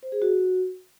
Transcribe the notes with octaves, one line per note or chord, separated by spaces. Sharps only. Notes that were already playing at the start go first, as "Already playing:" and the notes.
C5
G#4
F#4